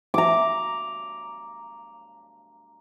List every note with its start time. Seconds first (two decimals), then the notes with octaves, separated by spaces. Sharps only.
0.14 A#5 D6